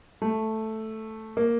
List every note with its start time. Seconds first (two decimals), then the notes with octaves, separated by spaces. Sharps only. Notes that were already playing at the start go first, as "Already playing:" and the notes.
0.22 A3
1.37 A#3